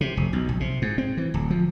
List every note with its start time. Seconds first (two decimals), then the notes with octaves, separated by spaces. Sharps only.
0.01 C3
0.17 F1
0.33 B1
0.49 A#1
0.60 C3
0.82 G#2
0.98 C4
1.17 E3
1.34 D1
1.50 F3